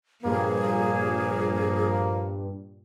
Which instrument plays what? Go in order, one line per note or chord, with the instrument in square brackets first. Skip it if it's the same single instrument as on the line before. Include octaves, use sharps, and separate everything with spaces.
[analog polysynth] G2 [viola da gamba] A#2 [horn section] F3 A#3 [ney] G#4